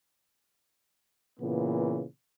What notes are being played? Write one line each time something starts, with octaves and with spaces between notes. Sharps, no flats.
A#2 C#3 E3 B3